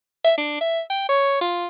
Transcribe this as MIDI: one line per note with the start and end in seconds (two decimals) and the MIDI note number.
0.24 0.37 76
0.38 0.57 62
0.61 0.81 76
0.90 1.06 79
1.09 1.39 73
1.41 1.67 65